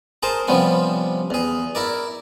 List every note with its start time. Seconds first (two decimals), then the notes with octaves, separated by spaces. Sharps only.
0.23 G#4 A#4 C5 A5
0.48 C3 F3 G3 B3 C#4
1.30 E2 G#4
1.75 E4 A#4 D5